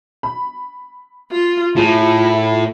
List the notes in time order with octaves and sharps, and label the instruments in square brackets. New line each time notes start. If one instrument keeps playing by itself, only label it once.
[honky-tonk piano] B5
[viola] F4
[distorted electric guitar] A2 [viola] E4 [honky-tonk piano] F4 G#4